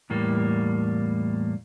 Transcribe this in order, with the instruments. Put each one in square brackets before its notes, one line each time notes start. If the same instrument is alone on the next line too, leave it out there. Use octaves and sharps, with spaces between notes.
[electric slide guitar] E2 A2 G3 A#3